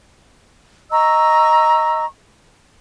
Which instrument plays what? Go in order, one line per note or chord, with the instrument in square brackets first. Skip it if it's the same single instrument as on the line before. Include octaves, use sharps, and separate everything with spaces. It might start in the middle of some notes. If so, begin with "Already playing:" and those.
[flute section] D#5 A#5 C#6 E6